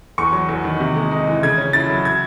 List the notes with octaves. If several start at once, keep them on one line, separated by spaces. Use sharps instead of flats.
E2 C#6
F#3
E2
D#3
C3
G#3
D#4
E3
C#3 G#6
C#4
E4 A6
F#3
G#6